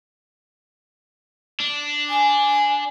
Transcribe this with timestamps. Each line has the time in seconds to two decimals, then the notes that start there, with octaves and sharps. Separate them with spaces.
1.60 D4
2.09 G#5